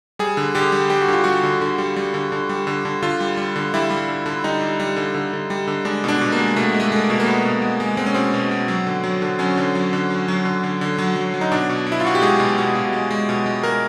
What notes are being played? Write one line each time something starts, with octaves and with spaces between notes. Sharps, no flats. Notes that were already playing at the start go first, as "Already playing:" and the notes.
G3 G#4
D3
D3 G4
G3
G3 G4
F#4
D3 F4
G3 F#4
D3
D3
G3
G3
D3
D3
G3
D3
D3
D3 F4
G3
G3
D3
G3 E4
G3
D3
D3
G3 D#4
G3
G3
D3
D3
D3
G3
D3
G#3 D4
B2 D4
B2
A#3
G#3
B2 A3
G#3
A3
G#3 A3
A#3
B2
A#3
B2 B3
B2
G#3
G#3
G#3 C4
C#4
B2 C4
B2
B2
F#3
D3
F#3
D3
F#3 C#4
D3
F#3
D3
F#3
F#3
D3
D3
D3
F#3
F#3
F#3
D#4
B2 D4
B2
B2
E4
F4
B2 F#4
G4
G#3 G#4
B2
B2
B2
G#3
G#3
B2
G#3
G#3 A#4